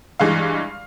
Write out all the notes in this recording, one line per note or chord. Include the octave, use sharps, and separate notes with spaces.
G2 E3 G#3 F5